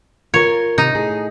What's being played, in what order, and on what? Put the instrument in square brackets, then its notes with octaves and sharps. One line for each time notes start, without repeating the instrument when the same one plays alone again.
[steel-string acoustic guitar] F4 A#4 [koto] C#5
[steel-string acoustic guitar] C3 [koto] D#4
[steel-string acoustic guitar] A2 G#4